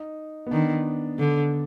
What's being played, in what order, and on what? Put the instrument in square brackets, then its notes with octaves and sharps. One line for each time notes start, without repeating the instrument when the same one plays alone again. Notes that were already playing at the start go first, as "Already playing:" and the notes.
Already playing: [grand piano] D#4
B3
[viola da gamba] D#3 [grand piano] D4
[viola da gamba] D3